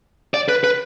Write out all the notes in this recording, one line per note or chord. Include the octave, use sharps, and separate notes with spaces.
D5
B4
B4